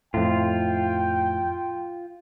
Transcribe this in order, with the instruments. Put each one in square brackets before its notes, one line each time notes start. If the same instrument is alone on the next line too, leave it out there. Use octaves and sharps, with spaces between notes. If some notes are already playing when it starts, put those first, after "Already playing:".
[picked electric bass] F2 A2 [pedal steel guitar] F4 [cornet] G5